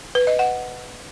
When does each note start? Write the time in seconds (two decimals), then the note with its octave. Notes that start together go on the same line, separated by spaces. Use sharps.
0.15 B4
0.27 D#5
0.39 F#5